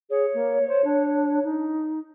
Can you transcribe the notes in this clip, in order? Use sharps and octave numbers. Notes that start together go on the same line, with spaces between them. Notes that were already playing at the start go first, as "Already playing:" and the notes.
G#4 C#5
A#3
C5
D4
D#4